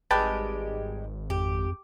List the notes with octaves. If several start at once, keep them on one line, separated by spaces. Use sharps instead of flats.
G#1 G3 G#3 G4 B4 G5 A5
F2 G4